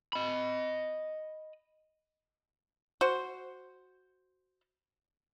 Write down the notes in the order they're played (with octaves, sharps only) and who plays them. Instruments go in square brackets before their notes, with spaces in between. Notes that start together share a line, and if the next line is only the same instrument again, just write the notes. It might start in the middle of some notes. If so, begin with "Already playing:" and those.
[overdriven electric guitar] D#5 B5
[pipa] F#4 C5